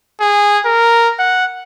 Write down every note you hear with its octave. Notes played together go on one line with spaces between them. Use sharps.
G#4
A#4
F#5